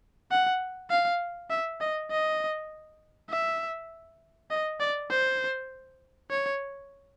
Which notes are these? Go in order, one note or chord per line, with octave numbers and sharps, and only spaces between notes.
F#5
F5
E5
D#5
D#5
E5
D#5
D5
C5
C#5